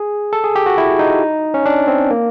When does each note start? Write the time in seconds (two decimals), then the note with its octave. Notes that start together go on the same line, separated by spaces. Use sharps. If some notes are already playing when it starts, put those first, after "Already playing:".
Already playing: G#4
0.33 A4
0.44 G#4
0.56 G4
0.66 F#4
0.78 E4
0.99 D#4
1.54 C#4
1.66 D4
1.88 C4
2.11 A#3